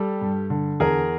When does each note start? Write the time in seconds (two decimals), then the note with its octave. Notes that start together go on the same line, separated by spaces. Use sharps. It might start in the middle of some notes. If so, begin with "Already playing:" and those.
Already playing: G3 G4 A4
0.21 G2
0.50 D3
0.80 E2 G#4 A#4